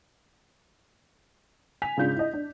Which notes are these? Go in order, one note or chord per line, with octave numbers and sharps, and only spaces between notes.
G#5 B6 F7
G#2 C#3 D4 F4 G6
E4 D#5
D4